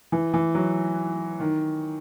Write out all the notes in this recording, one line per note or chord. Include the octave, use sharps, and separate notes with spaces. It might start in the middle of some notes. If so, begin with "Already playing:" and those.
E3
E3
F#3
D#3